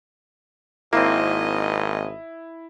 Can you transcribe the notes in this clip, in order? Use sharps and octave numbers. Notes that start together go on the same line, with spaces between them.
G#1 A#3 C4 E4 D#5